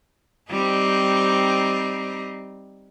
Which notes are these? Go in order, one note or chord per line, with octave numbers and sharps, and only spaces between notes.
G3 C4 D#4